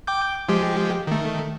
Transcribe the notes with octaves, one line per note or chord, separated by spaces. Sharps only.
G5 D6 G6
F3 G#3 G4
D#3 A3